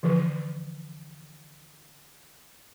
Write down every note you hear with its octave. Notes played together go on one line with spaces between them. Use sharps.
D3 E3 F3 B4